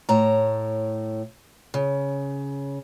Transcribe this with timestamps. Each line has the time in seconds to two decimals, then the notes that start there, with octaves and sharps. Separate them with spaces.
0.09 A2 C#5 A#5
1.74 C#3